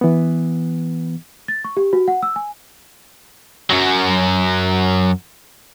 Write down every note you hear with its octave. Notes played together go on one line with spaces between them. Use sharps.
E3 B3
A6
C#6
G4
F#4
F#5
E6
G#5
F#2 F#3